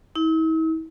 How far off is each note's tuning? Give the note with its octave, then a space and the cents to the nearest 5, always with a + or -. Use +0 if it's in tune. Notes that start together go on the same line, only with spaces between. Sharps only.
E4 -45